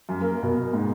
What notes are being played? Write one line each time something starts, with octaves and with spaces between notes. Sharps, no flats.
F#2
A#3
B2
G#2